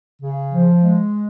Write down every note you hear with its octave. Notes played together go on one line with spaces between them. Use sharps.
C#3
F3
G#3